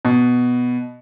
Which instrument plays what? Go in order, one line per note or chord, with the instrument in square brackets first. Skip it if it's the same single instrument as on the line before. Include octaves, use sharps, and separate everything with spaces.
[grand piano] B2